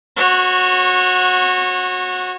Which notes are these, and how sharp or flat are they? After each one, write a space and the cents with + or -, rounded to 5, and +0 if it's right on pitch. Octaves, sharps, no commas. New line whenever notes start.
F#4 -15 C#5 -30